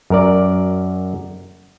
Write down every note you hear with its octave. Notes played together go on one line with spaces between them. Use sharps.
F#2 A#4 D5